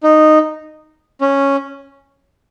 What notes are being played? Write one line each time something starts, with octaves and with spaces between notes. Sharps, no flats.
D#4
C#4